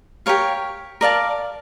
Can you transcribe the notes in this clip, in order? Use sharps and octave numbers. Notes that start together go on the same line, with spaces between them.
G4 A#4 C#5 F5
A#4 D5 F5 A5